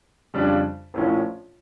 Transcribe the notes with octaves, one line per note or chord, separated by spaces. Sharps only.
F2 C#3 G3 D4
A#1 A2 F3 C#4